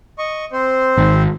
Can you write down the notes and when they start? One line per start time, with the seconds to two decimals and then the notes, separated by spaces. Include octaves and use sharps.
0.19 D#5 C#6
0.52 C4 C5
0.97 G#1